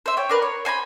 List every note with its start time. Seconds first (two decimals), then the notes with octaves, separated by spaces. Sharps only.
0.06 C5 E5
0.17 C#5 G5
0.29 D4 A#4 B4
0.42 C#5
0.65 C5 G#5 A#5 B5